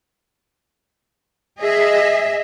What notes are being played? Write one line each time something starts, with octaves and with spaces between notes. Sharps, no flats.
G#4 D#5 E5